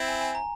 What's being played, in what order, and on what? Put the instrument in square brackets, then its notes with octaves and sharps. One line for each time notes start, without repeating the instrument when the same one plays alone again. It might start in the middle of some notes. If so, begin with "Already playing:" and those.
Already playing: [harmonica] C4 E4
[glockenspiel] G#5
G#5
A#5